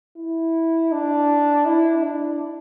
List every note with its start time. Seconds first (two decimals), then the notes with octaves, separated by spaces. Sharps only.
0.18 E4
0.92 D4
1.65 E4
2.03 D4